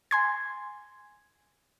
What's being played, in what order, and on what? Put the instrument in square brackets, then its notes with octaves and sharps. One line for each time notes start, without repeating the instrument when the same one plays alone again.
[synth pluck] G#5 C6 G#6